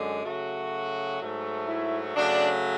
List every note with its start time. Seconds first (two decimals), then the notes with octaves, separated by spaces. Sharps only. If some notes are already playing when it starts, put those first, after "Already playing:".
Already playing: F#2 D3 G#3
0.25 C#3 F#3 A3 F#4
1.20 G#2 F#3 A3
1.67 E4
2.15 C#3 F#3 A3 D4